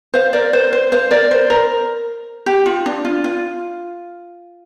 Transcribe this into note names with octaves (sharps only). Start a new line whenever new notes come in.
C5 F5
A#4 D5
C5
C5
C5 F5
A#4 D5
C5
A#4
G4
F4
D4
F4
F4